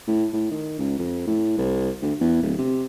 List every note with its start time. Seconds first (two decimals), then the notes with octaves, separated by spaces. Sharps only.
0.08 A2
0.33 A2
0.51 D#3
0.79 C#2
0.99 F2
1.27 A2
1.58 C2
2.02 D2
2.21 E2
2.42 D1
2.58 C3